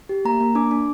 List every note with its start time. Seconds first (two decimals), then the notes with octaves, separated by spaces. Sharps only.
0.09 G4
0.25 A#3 A#5
0.40 A#3
0.55 D4 D6
0.71 D4